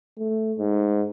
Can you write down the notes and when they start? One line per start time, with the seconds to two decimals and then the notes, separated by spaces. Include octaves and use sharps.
0.18 A3
0.59 G#2